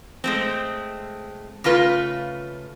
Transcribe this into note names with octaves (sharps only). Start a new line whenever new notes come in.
G#3 A3 C4
C#3 A3 F4 B4